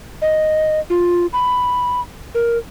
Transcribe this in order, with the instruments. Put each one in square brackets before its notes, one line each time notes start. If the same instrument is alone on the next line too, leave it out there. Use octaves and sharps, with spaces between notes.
[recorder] D#5
F4
B5
A#4